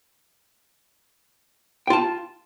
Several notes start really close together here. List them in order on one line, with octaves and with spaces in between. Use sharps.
G5 F4 A5